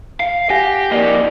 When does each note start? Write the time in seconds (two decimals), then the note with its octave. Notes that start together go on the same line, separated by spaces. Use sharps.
0.20 F5
0.50 G4 F#5 G#5 A#6
0.92 F2 A#3 D5 D#5